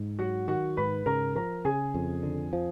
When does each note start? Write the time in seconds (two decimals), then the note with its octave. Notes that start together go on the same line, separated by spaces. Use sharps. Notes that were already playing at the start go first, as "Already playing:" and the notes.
Already playing: G#2
0.19 F#3 F#4 F#5
0.48 D#3 F#4 F#5
0.77 G#2 B4 B5
1.06 C#3 A#4 A#5
1.35 F3 A#4 A#5
1.65 C#3 G#4 G#5
1.94 F2
2.23 D3
2.53 F3